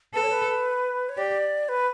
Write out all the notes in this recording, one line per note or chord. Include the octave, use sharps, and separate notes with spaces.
A4 B4
C#5
B4
C#5
G4 D5
B4